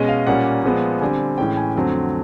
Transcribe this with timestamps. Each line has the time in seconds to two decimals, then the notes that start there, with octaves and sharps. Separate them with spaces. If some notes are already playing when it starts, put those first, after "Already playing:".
Already playing: B2 G#3 C#4 D#5
0.09 F5
0.27 A#2 G3 A#3 C#4 F#5
0.64 A#2 F3 G#3 B3
1.01 D3 G3 C4 G#5
1.38 A2 E3 G#3 C#4 G5
1.57 G#5
1.76 F2 D3 F#3 A3 C4